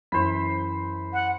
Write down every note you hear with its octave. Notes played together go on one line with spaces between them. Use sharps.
F#2 E3 C5 B5
F#5